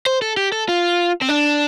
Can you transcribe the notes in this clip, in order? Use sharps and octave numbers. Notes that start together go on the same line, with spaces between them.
C5
A4
G4
A4
F4
C4
D4